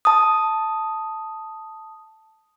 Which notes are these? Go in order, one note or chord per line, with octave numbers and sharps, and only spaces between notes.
A5 D#6